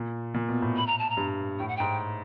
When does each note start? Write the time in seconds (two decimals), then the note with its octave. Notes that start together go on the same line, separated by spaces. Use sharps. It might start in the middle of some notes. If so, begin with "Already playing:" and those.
Already playing: A#2
0.34 A#2
0.49 B2
0.62 A2
0.77 B5
0.87 A#5
0.99 A5
1.10 A#5
1.17 G2
1.59 A2 G5
1.68 F#5
1.77 G#2 G5